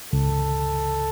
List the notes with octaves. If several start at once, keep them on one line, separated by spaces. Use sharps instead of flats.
C#2 A4